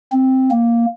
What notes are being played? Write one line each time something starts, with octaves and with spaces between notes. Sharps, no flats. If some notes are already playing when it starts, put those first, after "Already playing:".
C4
A#3